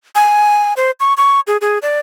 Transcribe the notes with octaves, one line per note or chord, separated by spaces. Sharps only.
G#5
C5
C#6
C#6
G#4
G#4
D5